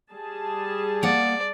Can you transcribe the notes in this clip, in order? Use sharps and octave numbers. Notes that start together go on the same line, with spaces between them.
G3 G#4 A5
A#3 D5 F#5